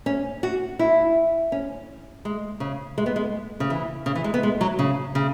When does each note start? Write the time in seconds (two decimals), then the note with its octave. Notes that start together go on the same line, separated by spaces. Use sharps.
0.06 C#4
0.43 F#4
0.79 E4
1.52 C#4
2.25 G#3
2.60 C#3
2.98 G#3
3.06 B3
3.16 G#3
3.60 C#3
3.70 E3
4.06 C#3
4.15 E3
4.24 G#3
4.34 B3
4.43 G#3
4.61 F#3
4.79 C#3
5.15 C#3